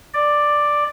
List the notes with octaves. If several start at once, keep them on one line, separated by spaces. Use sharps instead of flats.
D5